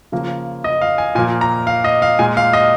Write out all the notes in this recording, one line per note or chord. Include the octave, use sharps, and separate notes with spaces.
C#3 F3 A#3
D#5
F5
G#5
A#2 F3 A#3 G#5
A#5
F5
D#5
F5
A#2 G#3 G#5
F5
D#5